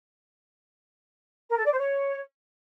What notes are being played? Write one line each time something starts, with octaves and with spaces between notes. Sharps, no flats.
A#4
A4
D5
C5
C#5